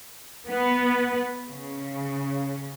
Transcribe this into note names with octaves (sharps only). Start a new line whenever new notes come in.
B3
C#3